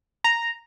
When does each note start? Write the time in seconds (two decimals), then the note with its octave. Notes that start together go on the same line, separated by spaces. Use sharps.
0.24 A#5